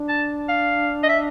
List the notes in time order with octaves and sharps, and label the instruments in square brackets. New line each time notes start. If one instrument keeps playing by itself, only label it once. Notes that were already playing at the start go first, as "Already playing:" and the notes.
Already playing: [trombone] D4
[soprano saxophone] A5
F5
D#5
E5